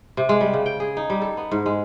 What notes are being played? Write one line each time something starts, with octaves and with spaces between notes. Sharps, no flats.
C3
G#3
G3
C#3
G5
G#4
D#4
G3
A4
B3
G#2
G#3